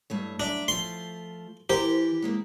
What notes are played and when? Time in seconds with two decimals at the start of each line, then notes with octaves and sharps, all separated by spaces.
0.10 G2 A3 C#5
0.40 F#2 D4 E5
0.68 F3 A3 C6
1.70 E3 G4 A#4 C5
2.22 G#3 A#3 C4